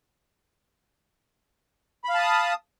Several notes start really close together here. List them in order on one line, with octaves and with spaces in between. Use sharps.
B5 F5 A5 D#6